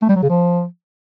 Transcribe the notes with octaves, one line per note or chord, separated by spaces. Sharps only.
A3
G3
F#3
C#3
F3